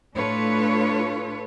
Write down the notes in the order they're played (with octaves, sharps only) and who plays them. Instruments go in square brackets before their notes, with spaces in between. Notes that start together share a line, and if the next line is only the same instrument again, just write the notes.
[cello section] A2 D4 F4 A4 B4 C#5